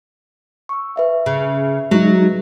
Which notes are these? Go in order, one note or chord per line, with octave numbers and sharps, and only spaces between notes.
C#6 E6
B4 E5 F5
C#3
F#3 G#3 D#4